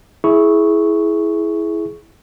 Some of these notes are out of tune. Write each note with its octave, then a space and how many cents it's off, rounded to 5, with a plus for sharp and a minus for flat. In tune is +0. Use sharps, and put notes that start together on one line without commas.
E4 +0 G#4 +15 C#6 +0